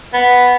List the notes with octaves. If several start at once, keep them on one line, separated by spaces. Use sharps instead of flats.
B3